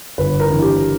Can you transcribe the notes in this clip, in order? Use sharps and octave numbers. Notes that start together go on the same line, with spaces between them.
G1 B4
A#4
G2 E3
G4